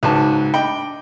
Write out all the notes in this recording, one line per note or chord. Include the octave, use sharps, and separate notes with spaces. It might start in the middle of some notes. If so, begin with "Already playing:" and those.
C#2 G#2 F#4 A5
D4 D#5 G5 B5